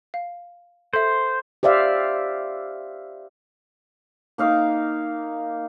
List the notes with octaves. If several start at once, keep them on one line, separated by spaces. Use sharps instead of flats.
F5
A4 C5 E5
G4 C5 D5 E5 F5
A#3 D#4 F5 D6